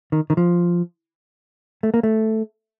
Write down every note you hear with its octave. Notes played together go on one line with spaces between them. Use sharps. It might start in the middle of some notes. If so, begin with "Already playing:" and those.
D#3
D#3
F3
A3
A#3
A3